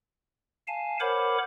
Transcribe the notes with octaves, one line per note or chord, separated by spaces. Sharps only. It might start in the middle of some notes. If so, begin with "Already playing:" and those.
F5 G#5 A5
A#4 C5 C#5 F#5 B5 D6